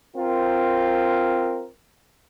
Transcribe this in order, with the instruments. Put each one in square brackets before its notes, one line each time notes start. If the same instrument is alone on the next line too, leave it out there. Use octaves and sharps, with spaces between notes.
[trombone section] C4 F4 A#4